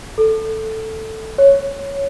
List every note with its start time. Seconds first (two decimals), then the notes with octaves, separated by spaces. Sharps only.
0.18 A4
1.38 C#5